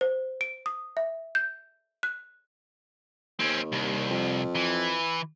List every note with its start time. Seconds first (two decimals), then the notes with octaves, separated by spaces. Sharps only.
0.01 C5
0.41 D7
0.66 D#6
0.97 E5
1.35 G6
2.03 F#6
3.39 D#2 C4 C#4
3.72 C2
4.10 F2
4.56 E3